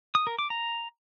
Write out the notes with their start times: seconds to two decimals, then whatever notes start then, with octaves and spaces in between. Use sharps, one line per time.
0.15 D#6
0.27 A#4
0.39 D6
0.50 A#5